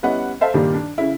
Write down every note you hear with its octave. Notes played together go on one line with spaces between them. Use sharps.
G3 B3 C#4 E4 D#5 F#5
A4 C5 E5 F5 A5
G2 A#2 D#3 G3
D4
C#3 E4